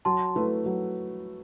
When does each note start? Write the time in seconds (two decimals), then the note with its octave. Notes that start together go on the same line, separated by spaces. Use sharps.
0.05 F#3 A5 C6
0.35 A3 E4 B4
0.66 F#3